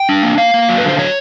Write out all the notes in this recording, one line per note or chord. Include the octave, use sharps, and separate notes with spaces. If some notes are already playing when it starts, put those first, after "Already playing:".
Already playing: G5
D4
A#3
A#3 F5
A#3
F#3
B4
D3 C5
F#3 C#5